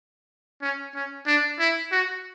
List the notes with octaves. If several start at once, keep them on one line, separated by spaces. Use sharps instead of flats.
C#4
C#4
D4
E4
F#4